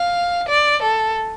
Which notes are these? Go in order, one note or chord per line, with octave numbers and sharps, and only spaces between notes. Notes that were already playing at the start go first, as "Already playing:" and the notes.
Already playing: F5
D5
A4